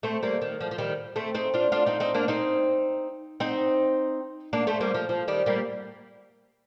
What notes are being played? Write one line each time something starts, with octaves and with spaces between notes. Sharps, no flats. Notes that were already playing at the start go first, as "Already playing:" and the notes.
A3 C4
G3 A#3
D#3
F3
F3
D#3 G3
A3 C4
C4 D#4
D4 F4
D4 F4
C4 D#4
C4 D#4
A#3 D4
C4 D#4
C4 D#4
A#3 D4
A3 C4
G3 A#3
F3
F3
D#3 G3
G3 A#3